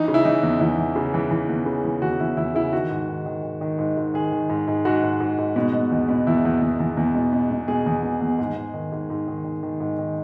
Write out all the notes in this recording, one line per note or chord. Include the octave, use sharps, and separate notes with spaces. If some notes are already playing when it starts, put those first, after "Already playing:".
Already playing: E3 D#4
C#3
E4
E3 D#4
E2
E2 E4
E3
C#3
E3
E3
E2
C#3
E3
E2 F#4
E2 E4
E2 E4
C#3 E4
D#3 F#4
G#2
D#3
D#3
D#3
D#3
G#2
G#2
D#3 G#4
D#3
G#2
G#2
G#2 F#4
G#2
G#2
G#2
B2
B2
E2
B2
E2 E4
E2
E2
E2
E2
B2
B2
B2
B2 G#4
E2
B2
E2
G#2
G#2
D#3
G#2
G#2
D#3
D#3
D#3
G#2
D#3